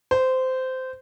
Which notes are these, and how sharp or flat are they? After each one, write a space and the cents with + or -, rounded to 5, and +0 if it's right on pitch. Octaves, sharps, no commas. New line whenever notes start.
C5 -15